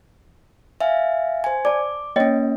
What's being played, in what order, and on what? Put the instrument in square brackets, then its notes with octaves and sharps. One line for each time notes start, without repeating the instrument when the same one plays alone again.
[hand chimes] E5 F5 G#5
C5 G#5
[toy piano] D5 A5 [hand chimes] D6
[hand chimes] A#3 C#4 [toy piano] C#5 D#5 G5